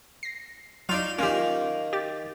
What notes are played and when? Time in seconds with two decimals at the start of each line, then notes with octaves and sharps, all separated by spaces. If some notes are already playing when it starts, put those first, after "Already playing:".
0.23 A#6 C7
0.89 F#3 D4 D#4 F4 F5
1.18 D#3 A#3 C#4 F4 G4
1.93 G4 A6